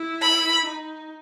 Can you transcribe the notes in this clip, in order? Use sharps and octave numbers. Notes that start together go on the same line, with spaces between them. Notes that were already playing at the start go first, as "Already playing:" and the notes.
Already playing: E4
B5
D#4